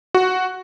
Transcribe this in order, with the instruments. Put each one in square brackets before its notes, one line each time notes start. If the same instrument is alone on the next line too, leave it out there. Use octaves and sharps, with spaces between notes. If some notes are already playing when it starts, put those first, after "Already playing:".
[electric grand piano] F#4